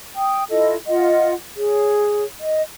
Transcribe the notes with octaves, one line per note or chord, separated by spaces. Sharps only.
G5 D#6
E4 F4 A4 D#5
F4 D#5 F#5
G#4 C#5
D#5